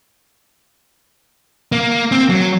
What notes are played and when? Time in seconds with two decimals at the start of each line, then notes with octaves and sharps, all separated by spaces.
1.72 A#3
2.11 C4
2.29 F#3